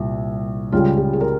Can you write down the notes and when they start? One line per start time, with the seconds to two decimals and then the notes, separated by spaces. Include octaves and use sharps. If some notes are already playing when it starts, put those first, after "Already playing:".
Already playing: C2 A#2 G3
0.72 C#2 C#3 G3 F4
0.97 G4
1.13 G#4
1.21 A#4